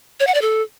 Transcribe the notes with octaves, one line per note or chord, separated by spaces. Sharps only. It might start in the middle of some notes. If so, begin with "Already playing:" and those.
C#5
F#5
D5
A4